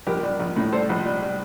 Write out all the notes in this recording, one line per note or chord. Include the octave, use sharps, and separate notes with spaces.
A#1 G4 A#4
G3
A#1
A2
G3 A4 C5
A#1
G3
G3